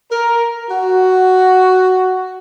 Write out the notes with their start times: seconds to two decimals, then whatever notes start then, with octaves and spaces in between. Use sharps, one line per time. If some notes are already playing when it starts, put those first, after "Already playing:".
0.12 A#4
0.70 F#4